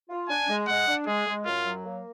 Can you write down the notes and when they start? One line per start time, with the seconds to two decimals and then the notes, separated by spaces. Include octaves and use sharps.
0.09 F4
0.29 D4 G#5
0.49 G#3
0.67 G#3 F#5
0.88 D4
1.07 G#3 G#4
1.27 G#3
1.45 F#2 F4
1.66 F#3
1.85 A#3